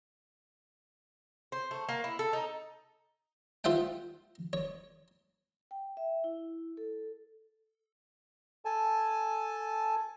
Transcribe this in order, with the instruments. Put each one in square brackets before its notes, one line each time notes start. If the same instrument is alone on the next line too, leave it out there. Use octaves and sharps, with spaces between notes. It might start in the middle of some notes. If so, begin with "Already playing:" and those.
[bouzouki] C5
A3
A#3
E4
A4
D#4
[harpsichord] F4 C5 E5 F#5 G5
C#5
[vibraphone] G5
E5
E4
A4
[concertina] A4 G#5 A5